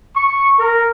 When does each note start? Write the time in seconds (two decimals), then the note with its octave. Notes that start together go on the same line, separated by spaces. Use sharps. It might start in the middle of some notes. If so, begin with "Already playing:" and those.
0.15 C#6
0.58 A#4